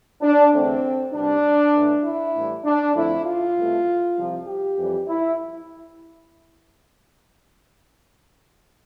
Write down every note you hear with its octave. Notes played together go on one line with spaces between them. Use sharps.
D4
E2 D3 A3 C4
C2 B2 G3 D4
A2 E3 A3
E4
A2 E3 G3
D4
F2 D3 F3 A3 E4
F4
C2 B2 A3
C2 C3 F3
G4
F2 E3 G3
E4